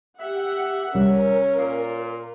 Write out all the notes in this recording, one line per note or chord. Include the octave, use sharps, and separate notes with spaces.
G4 E5 F#5
C2 G3 C#4 A#4
A#2